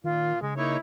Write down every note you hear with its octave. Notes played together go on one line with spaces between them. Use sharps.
A#2 D#3 F4
C#3 G#3
A#3 D#4 E4 C#5